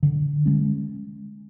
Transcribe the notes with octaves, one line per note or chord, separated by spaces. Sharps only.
D3
G#3 C#4